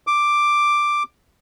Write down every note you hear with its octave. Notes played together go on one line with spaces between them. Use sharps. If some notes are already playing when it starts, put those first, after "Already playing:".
D6